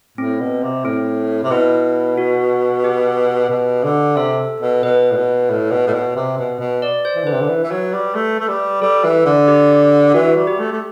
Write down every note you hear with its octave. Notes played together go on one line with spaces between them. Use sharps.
A2 C4
B2
C3
A2 C4
C3
B2 E4
F#4
G4
B2
D3
C3 A4
B2
B2 B4
A2
B2
A2
B2
A2
B2
C3
B2
B2
D5
C5
E3
D3 B4
C3
D3
E3
E3
F#3
G3
A3
A3
G3
G3 A4
E3
D3
G4
E3 F#4
G3
G4
A3
A3